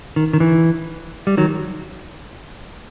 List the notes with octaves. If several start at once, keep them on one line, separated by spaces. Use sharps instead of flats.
D#3
D#3
E3
G3
D#3 F#3